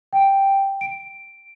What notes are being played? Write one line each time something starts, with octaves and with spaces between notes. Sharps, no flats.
G5
D7